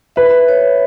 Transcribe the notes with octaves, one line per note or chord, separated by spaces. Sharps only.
B4 E5
C#5